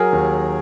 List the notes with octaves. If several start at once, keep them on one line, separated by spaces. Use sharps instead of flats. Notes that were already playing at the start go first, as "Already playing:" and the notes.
Already playing: F#3 G#4 A#4
D#2